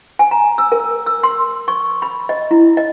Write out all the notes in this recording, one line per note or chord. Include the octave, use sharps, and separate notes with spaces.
G#5
A#5
E6
A#4
E6
C6
C#6
B5
D#5
E4
D#5